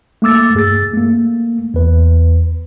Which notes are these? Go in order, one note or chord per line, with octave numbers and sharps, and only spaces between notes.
A3 A#3 D6 E6 A6
G2 G#4 E6 A6
A3 A#3
E2 B4